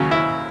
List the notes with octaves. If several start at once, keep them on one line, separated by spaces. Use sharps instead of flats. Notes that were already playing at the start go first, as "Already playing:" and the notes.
Already playing: D#2 C#3 F#3 C#4
E4